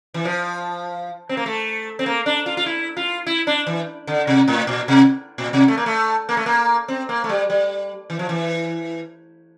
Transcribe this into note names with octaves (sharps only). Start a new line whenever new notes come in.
E3
F3
C4
A#3
A3
C4
A#3
D4
F4
F4
E4
F4
E4
D4
E3
D3
C3
A2
A#2
C3
A#2
C3
A3
A#3
A3
A#3
A3
A#3
C4
A#3
A3
G3
G3
E3
F3
E3